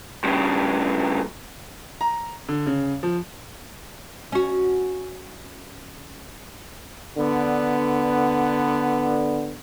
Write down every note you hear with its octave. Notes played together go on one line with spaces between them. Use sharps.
G2 C#3
A#5
D3
C#3
F3
C#4 F#4
D3 B3